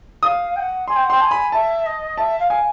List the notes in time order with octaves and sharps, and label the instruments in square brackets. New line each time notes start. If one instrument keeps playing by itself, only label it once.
[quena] F5 [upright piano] D#6
[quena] G5
F#5
[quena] G#5 [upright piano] C6
[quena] G5
F#5
[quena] G5 [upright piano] C6
[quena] A5
G#5
[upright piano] B5
[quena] E5 [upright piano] A5
[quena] D#5
[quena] E5 [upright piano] A5
[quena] F5
[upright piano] G#5